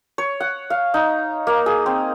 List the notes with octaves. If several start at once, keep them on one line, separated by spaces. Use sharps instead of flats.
C#5
F#5
F5
D#4
A#3
G#4
C4